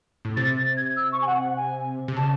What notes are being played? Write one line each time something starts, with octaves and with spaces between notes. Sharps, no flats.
A2
C3 A6
A6
G#6
E6
C#6
G#5
F#5
F#5
G#5
C3
C#3 A5